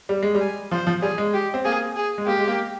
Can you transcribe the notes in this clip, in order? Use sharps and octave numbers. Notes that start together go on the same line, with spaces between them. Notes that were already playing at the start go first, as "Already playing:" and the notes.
G3
G#3
G3
G#5
F3 C5
F3
G3 G#4
G#3
G4
C4
A#3 G#4
G#4
G#3
A#3 G4
G#3
A#3